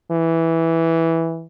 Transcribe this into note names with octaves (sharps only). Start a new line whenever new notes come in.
E3